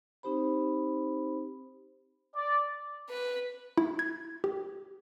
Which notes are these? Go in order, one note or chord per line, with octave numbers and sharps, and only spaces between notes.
C4 D#4 G4 C5 B5
D5
B4
E4
G#6
G4